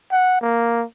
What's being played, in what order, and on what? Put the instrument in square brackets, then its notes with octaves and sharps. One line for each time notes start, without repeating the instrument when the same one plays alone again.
[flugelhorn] F#5
A#3